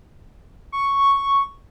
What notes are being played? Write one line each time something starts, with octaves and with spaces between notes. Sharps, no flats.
C#6